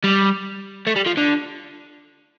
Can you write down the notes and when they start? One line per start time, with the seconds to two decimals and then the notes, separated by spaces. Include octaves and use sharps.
0.04 G3
0.87 A3
0.96 G3
1.06 F3
1.17 D3